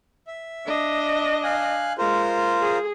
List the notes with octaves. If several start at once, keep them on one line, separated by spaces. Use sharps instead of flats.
E5
D4 D#5
F5 G#5 F#6
G#3 F4 A#4 C5
G#4